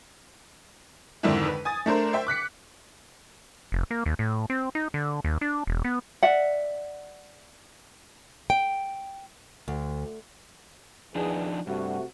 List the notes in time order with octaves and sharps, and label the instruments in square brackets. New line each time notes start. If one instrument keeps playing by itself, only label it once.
[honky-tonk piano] F2 G#2 D3 D#3 D4 E4
B4
G#5 D#6 A6
A3 D4 A#4 C5
C5 E5 G5
D6 F#6 B6 C#7
[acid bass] F1
A#3
D#2
A2
C4
D#4
D3
D#2
D4
E1
B3
[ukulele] D5 E5 F#5
[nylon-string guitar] G5
D2
[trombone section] E2 G#4 [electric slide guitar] F3 D4 D#4
[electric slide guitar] G2 [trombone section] C3 A3 F#4